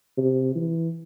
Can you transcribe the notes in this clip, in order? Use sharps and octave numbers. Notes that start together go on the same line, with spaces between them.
C3
E3